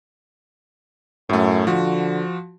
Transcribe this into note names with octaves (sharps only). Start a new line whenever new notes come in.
F#2 A2 A3
D3 F3 F#4